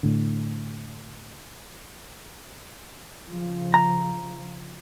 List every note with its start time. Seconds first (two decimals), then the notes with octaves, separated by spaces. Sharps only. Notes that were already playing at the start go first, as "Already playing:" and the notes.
0.03 A2 D3
3.26 C#3 F3
3.74 A#5